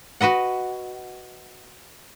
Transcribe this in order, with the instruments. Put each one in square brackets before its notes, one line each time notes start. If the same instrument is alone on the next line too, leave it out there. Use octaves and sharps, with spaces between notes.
[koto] F#4 B4 D#5 F#5